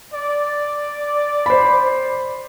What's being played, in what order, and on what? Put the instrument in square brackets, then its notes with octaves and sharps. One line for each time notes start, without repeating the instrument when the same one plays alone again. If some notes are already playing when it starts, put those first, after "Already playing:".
[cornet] D5
[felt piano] C5 B5